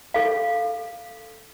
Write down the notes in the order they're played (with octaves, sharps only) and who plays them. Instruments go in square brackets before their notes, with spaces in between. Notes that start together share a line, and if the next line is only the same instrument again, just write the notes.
[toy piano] A4 F5